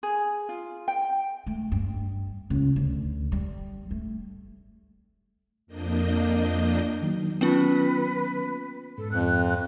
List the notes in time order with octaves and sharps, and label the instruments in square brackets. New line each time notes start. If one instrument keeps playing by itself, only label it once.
[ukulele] G#4
F4
G5
[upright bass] A3
G2
C#2
D2
G3
A3
[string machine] F2 A#3 D4 D#5 G6
[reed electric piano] D#3 F#3 A#3
[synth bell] B3 C#4 F4 [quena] B4
[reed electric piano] G#2 [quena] A4
[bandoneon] F2 [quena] F#6